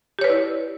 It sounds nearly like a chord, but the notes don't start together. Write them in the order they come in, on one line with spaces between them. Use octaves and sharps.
G4 C#5 B4 D5 E4